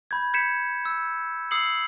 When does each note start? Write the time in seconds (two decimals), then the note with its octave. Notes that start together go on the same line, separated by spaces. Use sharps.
0.11 B5 G6 G#6
0.34 G6 G#6 B6 C#7 E7
0.85 E6
1.51 D#6 E6 C7 C#7 F#7